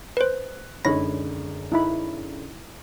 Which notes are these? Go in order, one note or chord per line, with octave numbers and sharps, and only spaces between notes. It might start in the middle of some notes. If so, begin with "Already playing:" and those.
B4 C5 F#6
F#2 D3 G#3 D#4 C#5 B5 A#6
D#4 E4 B5